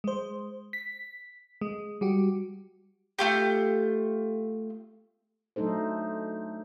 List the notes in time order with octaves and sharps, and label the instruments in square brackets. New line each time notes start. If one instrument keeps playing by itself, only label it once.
[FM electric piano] G#3 C5
B6
G#3
G3 F#4 G4
[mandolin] A3 F4 G4
[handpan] F#3 A3 D4 D#4 A4 C5